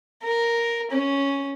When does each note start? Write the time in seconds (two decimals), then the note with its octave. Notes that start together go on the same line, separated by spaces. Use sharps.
0.23 A#4
0.91 C#4